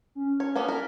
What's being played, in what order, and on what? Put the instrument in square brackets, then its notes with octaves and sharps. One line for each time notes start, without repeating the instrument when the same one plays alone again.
[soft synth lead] C#4
[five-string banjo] C#5
A#3 B3 C#4
[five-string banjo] A#4 [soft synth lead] B6